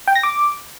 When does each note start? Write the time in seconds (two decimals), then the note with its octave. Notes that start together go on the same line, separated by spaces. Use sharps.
0.08 G5
0.15 A#6
0.23 D6